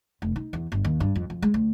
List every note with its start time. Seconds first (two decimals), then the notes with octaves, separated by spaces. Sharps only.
0.22 F1
0.36 D#4
0.53 E2
0.72 G1
0.85 D#2
1.00 G2
1.15 F2
1.30 F2
1.42 G#3
1.54 D2